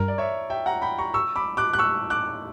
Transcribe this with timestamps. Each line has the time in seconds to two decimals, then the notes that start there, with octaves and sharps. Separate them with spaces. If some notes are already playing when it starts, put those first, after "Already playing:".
Already playing: G2 G3 A#4
0.08 D5
0.18 C#5 E5
0.50 E5 G5
0.66 F#5 A#5
0.82 G5 B5
0.98 A#5 C#6
1.14 C#6 E6
1.36 B5 D6
1.57 D6 F#6
1.73 F#6
1.78 C#6 E6
2.10 D6 F#6